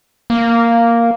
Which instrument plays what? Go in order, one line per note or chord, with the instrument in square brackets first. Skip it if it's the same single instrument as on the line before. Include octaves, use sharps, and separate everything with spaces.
[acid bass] A#3